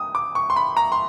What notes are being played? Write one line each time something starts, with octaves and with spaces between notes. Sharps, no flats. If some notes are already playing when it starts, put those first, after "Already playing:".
Already playing: D#6
D6
C#6
C6
B5
A#5
C6